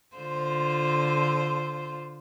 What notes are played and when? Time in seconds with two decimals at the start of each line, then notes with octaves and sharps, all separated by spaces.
0.16 D3 F4 C5